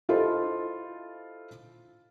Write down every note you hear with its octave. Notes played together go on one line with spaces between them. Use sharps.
E4 F4 G4 A4 C5 D#5